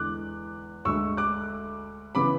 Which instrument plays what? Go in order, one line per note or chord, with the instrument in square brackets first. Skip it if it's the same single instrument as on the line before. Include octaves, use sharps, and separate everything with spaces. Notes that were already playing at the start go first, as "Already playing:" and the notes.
Already playing: [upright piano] E2 D3 G#3 D6 F#6
D2 D3 G#3 C#6 E6
D6 F#6
C#3 E3 B3 B5 D6